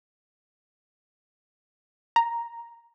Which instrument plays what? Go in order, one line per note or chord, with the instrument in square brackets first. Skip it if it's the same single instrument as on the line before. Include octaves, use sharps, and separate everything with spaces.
[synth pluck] A#5